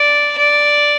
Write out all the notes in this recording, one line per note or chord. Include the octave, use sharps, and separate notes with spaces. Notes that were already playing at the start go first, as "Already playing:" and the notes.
Already playing: D5
D5